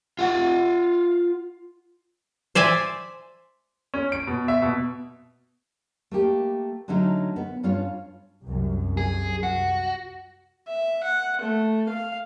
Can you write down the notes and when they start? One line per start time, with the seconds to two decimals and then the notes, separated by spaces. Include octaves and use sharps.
0.19 F4 F#5
2.55 C5 D5 E5 G#5
3.94 C#4
4.12 D7
4.27 B2
4.48 E5
4.62 B2
6.11 A3 A#3 G4
6.88 D3 F#3 A3 C#4 D#4
7.36 B3
7.63 G2 C#4 F4 C#5
8.43 C2 F#2
8.97 G#4
9.43 F#4
10.68 E5
11.04 F#5
11.41 A3
11.89 F5